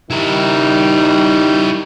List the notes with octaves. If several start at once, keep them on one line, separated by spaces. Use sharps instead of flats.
D#3 G3 D#4 E4 A#4